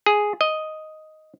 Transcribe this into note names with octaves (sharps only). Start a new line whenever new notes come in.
G#4
D#5